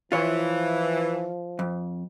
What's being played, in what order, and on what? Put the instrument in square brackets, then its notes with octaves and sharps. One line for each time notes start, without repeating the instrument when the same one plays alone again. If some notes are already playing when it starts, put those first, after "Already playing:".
[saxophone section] E3 [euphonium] F3 [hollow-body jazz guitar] F4 C#5
[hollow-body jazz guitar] F2